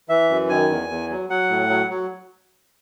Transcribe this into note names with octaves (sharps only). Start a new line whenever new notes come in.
E3 E5
F#2
D#3 G#5
E2
E2
F#3
F#3 F#5
A2
F#3
F#3